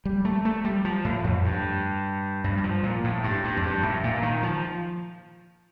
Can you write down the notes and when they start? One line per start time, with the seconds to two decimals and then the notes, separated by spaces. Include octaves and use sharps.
0.05 G3
0.25 A3
0.45 A3
0.64 G3
0.85 F3
1.05 A2
1.24 F2
1.45 G2
2.44 G2
2.57 G3
2.64 F3
2.83 A#2
3.04 A2
3.24 G2
3.44 G2
3.57 F2
3.63 G2
3.83 A2
4.04 A#2
4.23 D#3
4.43 F3